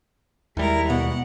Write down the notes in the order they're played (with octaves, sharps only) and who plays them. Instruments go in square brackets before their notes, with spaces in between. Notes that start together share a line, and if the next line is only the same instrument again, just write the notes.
[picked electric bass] D#2 G3 [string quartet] G#3 E4 A#4
[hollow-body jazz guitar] B2 [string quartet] F#5